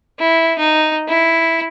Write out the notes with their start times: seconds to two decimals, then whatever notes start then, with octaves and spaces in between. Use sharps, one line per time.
0.19 E4
0.59 D#4
1.08 E4